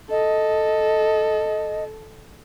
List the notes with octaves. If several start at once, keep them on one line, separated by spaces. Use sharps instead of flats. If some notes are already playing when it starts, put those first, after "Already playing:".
A4 D#5